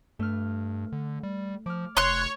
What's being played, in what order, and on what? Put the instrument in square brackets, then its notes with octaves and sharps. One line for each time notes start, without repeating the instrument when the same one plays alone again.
[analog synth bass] G2 [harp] A3 F6
[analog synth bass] D3
G3
[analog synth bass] F3 [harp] D6 F6
[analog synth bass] F1 [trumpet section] C#5 [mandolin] C6 F#6